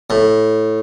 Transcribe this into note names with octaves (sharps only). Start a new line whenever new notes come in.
A2